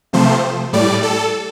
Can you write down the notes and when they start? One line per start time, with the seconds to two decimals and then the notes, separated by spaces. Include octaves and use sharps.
0.13 C3 F3 A3 C5
0.73 A2 G3 D5
1.03 A4